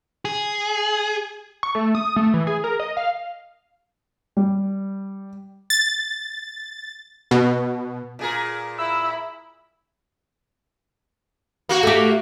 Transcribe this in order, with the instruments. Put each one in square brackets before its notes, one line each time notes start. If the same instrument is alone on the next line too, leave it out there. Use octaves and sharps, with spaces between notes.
[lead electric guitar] G#4
[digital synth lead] C#6
A3
D#6
A3
E3
G#4
A#4
D#5
F5
[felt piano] G3
[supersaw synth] A6
B2
[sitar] A#2 G#4 A#4
[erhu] E4 [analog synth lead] E6
[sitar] A#3 F#4
[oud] A3 G4